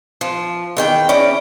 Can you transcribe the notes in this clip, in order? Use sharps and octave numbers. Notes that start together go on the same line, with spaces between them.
F3
E2 D#3 G5
C#4 E4 D5 A#5